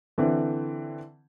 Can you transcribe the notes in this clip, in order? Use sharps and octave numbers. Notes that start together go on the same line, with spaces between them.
D3 E3 C4